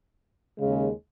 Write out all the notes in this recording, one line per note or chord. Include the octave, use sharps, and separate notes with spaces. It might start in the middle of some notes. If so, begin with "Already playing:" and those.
D#2 C#3 G#3